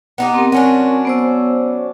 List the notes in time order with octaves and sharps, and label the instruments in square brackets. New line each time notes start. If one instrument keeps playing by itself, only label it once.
[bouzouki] B3 D#4 G4
[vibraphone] C4 A#4
[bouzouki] F#3 C#4 D4
[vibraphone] B3 C5 E6